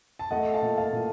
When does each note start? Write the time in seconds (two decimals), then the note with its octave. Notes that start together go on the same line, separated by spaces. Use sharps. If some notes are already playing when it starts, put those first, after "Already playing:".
0.19 A5
0.31 A3 D#5 F#5
0.54 F5 A5
0.62 A#2
0.78 F5 A5
0.93 A#2